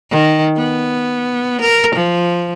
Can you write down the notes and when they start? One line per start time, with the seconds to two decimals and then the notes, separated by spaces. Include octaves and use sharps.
0.11 D#3
0.57 B3
1.62 A#4
1.95 F3